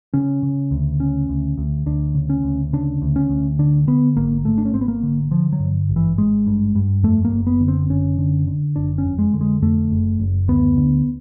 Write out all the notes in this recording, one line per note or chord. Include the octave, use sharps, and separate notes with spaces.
C#3 C#4
C#3
D2
C#3 C#4
D2
D2
D2 D4
C#3
C#4
D2
C#3 D4
D2
C#4
D2
D3 D4
D3 B3
G#1 A#3
G#1 A3
D4
C#4
G#1 C4
B3
A#3
D3
D3 F3
F#3
G2
G#1
E3
G#1 G#3
G2
G2
F2 A3
A#3
F#1
B3
D3
C4
F#1 C#4
D3
D3
F#1 D4
C#4
F2
G#3
D3
G#3
F2 A3
F#1
F#1
D2 B3
D3